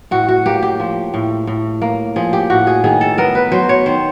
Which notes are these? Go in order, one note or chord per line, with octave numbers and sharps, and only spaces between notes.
A2 F#4
F#4
A#3 G4
G4
F3
A2
A2
A#3
F3 G#4
G4
A2 F#4
G#4
D#3 G#4
A4
B3 A#4
B4
F#3 C5
C#5
D#3 C5